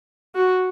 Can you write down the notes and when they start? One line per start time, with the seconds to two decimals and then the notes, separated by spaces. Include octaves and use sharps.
0.35 F#4